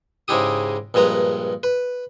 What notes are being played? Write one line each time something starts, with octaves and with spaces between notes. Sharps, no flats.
G#2 C#3 G#3 E4 G4 D#6
A#1 G2 G#3 B4 A#5
B4